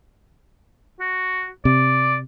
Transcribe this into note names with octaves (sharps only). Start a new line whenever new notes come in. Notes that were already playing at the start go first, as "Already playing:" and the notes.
F#4
C3 D5